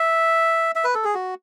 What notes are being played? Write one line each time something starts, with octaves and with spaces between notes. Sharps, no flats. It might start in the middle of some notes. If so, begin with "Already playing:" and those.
Already playing: E5
E5
B4
A4
G#4
F#4